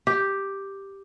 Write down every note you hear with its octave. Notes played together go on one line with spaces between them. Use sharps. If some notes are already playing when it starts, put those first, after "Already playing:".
G4